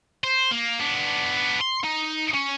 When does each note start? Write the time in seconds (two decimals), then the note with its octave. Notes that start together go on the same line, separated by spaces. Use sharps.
0.24 C5
0.51 A#3
0.80 B3 D4
1.61 C6
1.84 D#4
2.34 C#4